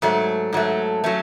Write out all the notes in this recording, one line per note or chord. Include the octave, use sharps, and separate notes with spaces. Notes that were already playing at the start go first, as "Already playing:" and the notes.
G#2 F#3 A3
G#2 F#3 A3
F#3 A3 C#4